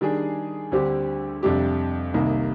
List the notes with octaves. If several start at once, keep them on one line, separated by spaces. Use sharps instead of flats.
D#3 G3 D4 G#4
D2 D3 G3 C4 G4
F2 C3 G3 D4 G4
C2 C3 D#3 A#3 D#4